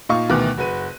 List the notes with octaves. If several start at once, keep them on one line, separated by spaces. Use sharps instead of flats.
A#2 D#4 F5 C#6
D2 B2 D#3 E3 D6 F#6
F#1 F#4 B4 D#7